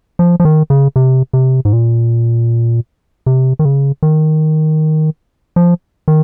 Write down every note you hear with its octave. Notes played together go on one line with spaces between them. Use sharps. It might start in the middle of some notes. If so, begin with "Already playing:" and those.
F3
F3
D#3
C#3
C3
C3
G#2
A#2
C3
D#3
C#3
D#3
F3
D#3